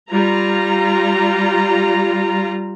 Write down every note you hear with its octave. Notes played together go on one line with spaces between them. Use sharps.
G3 F4 A#5